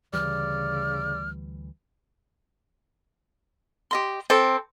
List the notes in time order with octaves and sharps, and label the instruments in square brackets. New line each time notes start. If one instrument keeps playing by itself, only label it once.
[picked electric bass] D2 E3 G3 [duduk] C#3 [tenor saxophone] D5 [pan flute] F6
[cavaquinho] G4 D#5 C6
[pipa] C4 [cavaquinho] A4 D6